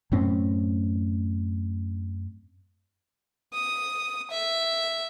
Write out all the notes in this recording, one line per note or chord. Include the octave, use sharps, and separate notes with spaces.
F#2 A2 C4 C#4
D#6
E5